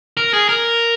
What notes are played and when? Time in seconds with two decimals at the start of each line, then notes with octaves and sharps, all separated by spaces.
0.17 A#4
0.33 G#4
0.49 A#4